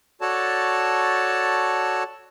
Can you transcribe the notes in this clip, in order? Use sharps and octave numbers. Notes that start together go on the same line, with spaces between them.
F#4 A4 C#5 D5 A5